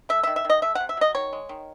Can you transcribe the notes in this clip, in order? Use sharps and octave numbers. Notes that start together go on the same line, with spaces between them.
A3 E5
E5
D#3
E5
D#3 D#5
A3 E5
F#5
C3
E5
F#3 D#5
D#3 C#5
G#3
D#3